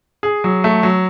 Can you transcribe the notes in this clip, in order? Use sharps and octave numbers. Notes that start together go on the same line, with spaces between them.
G#4
F#3
A3
F#3